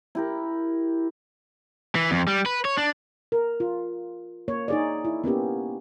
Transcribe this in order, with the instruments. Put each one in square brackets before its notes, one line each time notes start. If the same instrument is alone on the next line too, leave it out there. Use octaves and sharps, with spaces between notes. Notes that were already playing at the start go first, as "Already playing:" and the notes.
[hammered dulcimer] E4 G4 A#4
[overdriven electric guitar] E3
F2
G3
B4
C#5
D4
[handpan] A#4
F4
A#3 C#5
D#4 G#4 D5
E4
A#3 B3 C#4 G4